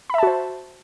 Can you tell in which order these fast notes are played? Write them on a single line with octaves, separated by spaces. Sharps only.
B5 E5 A5 F#4 C5